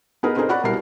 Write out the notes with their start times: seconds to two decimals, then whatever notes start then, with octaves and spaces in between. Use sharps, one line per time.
0.23 B3 D#4 G#4 A#4 B4
0.36 C4 D4 D#4 G#4 A#4
0.49 F#4 C#5 D5 F#5 B5 F#6
0.64 C2 B2 F#3 G3 A#4 C7